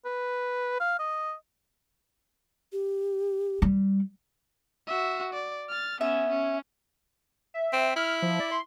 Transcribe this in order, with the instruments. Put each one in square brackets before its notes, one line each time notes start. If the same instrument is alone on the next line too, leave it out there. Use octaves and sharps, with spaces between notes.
[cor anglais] B4
F5
D#5
[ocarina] G4
[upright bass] G3
[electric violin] F#4 E5
D5
F6 A6
[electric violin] B3 C#4 [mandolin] E5 G#5
[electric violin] C#4
[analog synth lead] E5
[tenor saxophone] C4
[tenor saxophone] E4 [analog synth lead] F6
[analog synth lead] F3
D5
C6